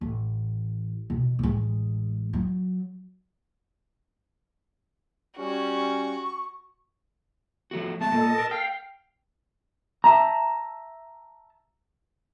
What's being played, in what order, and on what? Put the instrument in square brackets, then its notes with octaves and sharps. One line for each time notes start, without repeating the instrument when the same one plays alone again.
[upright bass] A1
B2
A1 G#3
F#3
[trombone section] G3 C#4 [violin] F#4
[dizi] C#6
[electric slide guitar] F3 A3 F#4
[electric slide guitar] G#3 E5 [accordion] A5
[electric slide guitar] A#2 A#3 [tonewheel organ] A4 D#5
[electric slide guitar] A#4
[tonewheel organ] F5 [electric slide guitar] G5
[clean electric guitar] E5 A5 A#5